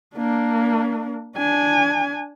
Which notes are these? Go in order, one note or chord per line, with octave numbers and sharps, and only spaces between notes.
A#3 D4
D4 G#5